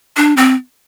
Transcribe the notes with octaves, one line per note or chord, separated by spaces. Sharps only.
D4
C4